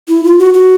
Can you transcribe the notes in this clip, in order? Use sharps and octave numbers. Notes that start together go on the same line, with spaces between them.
E4
F4
F#4
F#4